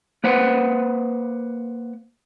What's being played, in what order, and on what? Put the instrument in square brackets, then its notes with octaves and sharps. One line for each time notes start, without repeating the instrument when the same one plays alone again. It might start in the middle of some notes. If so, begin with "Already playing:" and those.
[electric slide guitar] A#3 B4 C5 F#5